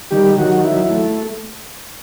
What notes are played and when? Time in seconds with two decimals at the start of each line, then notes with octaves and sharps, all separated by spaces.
0.11 D#3 G3 G4
0.38 D#3 F#3 F#4
0.64 F#3 E4
0.90 A3